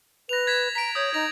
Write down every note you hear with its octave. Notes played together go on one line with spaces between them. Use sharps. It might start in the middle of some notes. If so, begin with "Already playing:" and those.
B4 A#6 F7
G#6 B6 E7
A#5 B6 D7
C#5 D#6 G6
D#4 A#6 F7